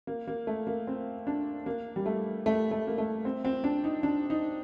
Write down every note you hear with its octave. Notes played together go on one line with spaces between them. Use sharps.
A#3
A#3
A3
A#3
C4
D4
A#3
G3
A3
A3
A3
A#3
A3
C4
C4
D4
D#4
D4
D#4